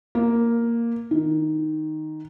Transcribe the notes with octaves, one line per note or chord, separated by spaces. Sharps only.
A#3
D#3